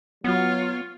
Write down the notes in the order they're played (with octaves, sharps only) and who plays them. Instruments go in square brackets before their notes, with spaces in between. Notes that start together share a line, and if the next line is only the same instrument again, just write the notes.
[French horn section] F#3 [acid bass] B3 [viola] F4 C#5